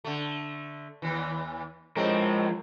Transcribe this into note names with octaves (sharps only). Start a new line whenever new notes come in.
D3 A3
D#2 E3
A2 F3 G#3 A3 C4 A#4